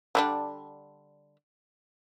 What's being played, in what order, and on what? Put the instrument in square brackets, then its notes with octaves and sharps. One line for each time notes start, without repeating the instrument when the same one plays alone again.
[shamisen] D3 G3 D4